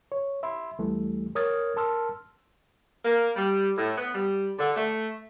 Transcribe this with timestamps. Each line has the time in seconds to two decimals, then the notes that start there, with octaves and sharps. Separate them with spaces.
0.12 C#5
0.43 E5 B5 C6
0.79 D2 E3 G3 A3
1.35 A#4 C#5 D#6 F6 G#6 A6
1.76 A#4 A5 C6 E6 F6
3.05 A#3
3.35 G3
3.76 A2
3.96 B3
4.13 G3
4.58 D3
4.76 A3